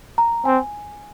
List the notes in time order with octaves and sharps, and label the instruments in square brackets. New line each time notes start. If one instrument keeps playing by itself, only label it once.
[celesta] A#5
[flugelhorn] C4 [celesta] G#5